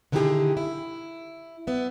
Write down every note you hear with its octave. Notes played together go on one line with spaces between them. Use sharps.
D3 D#3 E4 F4 G4 G#4
E4
B3 E5